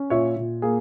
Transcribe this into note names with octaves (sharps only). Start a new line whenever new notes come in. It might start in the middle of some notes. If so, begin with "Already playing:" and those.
Already playing: C#4
A#2 C#5 E5
A#2
A#3 G#4